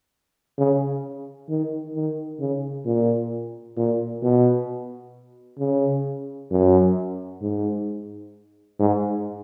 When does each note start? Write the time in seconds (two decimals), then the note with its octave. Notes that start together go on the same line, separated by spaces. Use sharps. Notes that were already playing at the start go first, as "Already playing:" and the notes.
0.58 C#3
1.49 D#3
1.94 D#3
2.39 C#3
2.85 A#2
3.77 A#2
4.23 B2
5.59 C#3
6.50 F#2
7.42 G#2
8.79 G#2